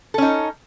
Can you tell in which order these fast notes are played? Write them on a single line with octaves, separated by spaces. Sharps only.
A4 C#4 D#4